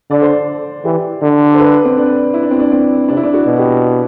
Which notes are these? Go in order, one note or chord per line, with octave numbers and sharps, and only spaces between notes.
D3 D5
C5
D5
E3 G4
D3
C5
B4
C4
D4
E4
D4
C4
D4
C4
C3 D4
E4
D4
F#4
B2
G4